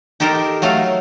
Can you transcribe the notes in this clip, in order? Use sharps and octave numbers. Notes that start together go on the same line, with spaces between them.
D#4 G4 A4 A#4 C5
F#3 A3 A4 F5